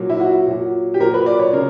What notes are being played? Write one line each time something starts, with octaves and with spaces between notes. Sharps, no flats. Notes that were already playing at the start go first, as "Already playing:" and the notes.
Already playing: A#2 F#3
E4
F#4
A#2 F#3
G4
A#2 F#3 A#4
B4
D5
C#5
C#3 A#4